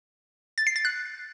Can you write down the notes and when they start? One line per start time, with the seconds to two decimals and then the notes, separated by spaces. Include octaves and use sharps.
0.58 A6
0.67 C7
0.76 A6
0.85 F#6